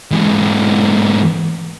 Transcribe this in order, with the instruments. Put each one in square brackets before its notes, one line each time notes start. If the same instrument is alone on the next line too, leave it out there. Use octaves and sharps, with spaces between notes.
[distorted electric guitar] G#2 E3